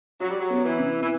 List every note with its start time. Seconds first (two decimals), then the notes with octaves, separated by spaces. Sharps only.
0.20 F#3 F#4
0.30 G3
0.40 F#3
0.50 B3
0.65 E3
0.79 C3
1.03 E3